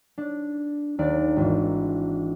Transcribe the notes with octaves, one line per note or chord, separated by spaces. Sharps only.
D4
D#2 D4 D5
G#1 E3